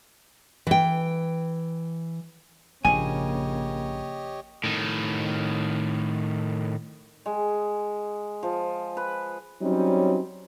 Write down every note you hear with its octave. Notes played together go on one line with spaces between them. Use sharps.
E3 G5
A#1 G#2 C#3 A#3 G4 C#5 D#5 G#5
A2 D#3
G#3
F3
B4
F#3 G3 C4 C#4 D#4